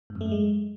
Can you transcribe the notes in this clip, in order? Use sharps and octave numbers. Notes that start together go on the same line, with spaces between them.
G#2
F#2
A3
F#2
G#3